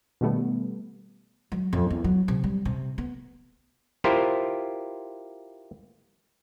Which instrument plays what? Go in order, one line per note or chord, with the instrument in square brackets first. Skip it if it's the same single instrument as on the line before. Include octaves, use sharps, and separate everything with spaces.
[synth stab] B2 D#3 G3 A3 B3
[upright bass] F#3
F2
E2
F#3
C3
G3
C3
B3
[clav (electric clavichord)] E4 F4 G4 A#4 C5